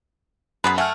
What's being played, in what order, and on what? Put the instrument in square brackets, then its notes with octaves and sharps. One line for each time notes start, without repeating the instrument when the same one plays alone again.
[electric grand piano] F#2 [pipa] B3 G#4 B4
[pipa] A3 [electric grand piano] F#5 G#5 F6